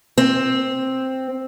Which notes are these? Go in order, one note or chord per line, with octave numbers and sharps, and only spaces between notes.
C4